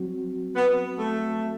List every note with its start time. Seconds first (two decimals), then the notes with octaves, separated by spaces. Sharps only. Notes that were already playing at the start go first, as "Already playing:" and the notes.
Already playing: F#3 C4 F#4
0.56 B3
0.98 A3